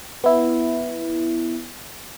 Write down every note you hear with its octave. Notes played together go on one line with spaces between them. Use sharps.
B3 E4